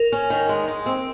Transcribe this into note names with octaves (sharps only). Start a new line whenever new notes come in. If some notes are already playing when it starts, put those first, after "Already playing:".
Already playing: A#4
C#4
D#3
G#3
G#3
C4